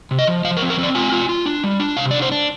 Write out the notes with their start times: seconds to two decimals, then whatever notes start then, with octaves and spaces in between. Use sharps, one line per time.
0.11 C3
0.19 D#5
0.27 F3
0.44 F3 F5
0.57 A#4
0.62 C4
0.70 A#4
0.79 C4 D5
0.95 F4 G#5
1.12 F4
1.29 F4
1.46 D4
1.64 G3
1.80 D4
1.97 C3 F5
2.11 D4 D5
2.22 C5
2.32 D4